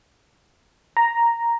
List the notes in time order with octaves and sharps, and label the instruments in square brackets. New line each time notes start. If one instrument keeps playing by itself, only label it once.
[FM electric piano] A#5